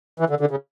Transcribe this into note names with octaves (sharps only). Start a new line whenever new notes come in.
E3
D3
D3
C#3